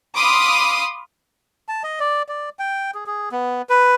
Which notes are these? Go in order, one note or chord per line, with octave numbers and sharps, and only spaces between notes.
F5 B5 C6 D6 D#6
A5
D#5
D5
D5
G5
G#4
G#4
B3
B4